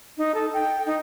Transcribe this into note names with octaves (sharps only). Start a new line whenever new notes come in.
D#4
A4
G5
D#4